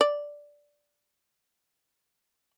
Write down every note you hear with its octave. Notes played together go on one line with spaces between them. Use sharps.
D5